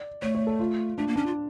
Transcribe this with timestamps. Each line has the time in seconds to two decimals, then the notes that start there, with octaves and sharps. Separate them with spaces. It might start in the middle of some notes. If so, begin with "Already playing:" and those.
Already playing: D5
0.22 A3 C#5
0.35 C#5
0.47 A4
0.60 F4
0.98 A3 D4
1.07 A#3
1.16 C#4 D4
1.26 F4